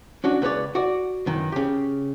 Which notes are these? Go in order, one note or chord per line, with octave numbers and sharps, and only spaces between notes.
C#4 D4 F#4
C#2 B4 C#5 D5
F#4 D5
F#2 D#3 E3
C#3 G4